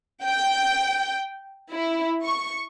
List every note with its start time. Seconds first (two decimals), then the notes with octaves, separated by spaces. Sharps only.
0.24 G5
1.71 E4
2.25 C#6